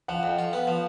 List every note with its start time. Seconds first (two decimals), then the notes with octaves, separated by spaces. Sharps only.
0.08 F3 F#5
0.23 F2
0.39 F4
0.53 B3
0.67 F3